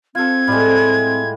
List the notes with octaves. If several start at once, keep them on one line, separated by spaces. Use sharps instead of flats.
C4 F4 A4 G#6
A2 G3 G#3